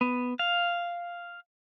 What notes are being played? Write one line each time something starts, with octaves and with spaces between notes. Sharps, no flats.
B3
F5